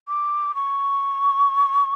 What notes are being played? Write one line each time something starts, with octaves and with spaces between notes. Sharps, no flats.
D6
C#6